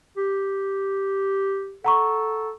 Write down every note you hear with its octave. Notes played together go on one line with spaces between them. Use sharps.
G4
A4 F#5 A#5 C#6